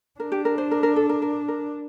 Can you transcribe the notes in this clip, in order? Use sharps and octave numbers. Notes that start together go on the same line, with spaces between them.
D4 A#4
G4
A#4
C5
A#4
A#4
A4
A#4
A#4
A#4